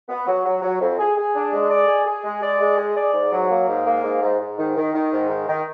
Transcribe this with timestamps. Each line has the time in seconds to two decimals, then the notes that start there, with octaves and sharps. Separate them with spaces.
0.09 B3
0.27 F#3
0.44 F#3
0.62 F#3
0.80 F2
0.99 G#4
1.17 G#4
1.35 D4
1.52 G#3
1.70 D5
1.88 G#4
2.06 G#4
2.24 G#3
2.42 D5
2.60 G#3
2.78 G#4
2.96 D5
3.14 G#2
3.31 F#3
3.50 A#3
3.68 G#2
3.86 A#3
4.03 G#2
4.22 G#2
4.40 G#2
4.58 D#3
4.76 D#3
4.94 D#3
5.12 G#2
5.29 D#3
5.48 D#3